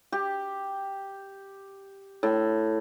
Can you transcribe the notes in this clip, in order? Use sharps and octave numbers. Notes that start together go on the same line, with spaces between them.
G4
A2